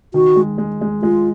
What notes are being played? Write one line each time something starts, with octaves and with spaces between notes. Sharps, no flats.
D#3 F#4
G#3
G#3
G#3
G#3 F4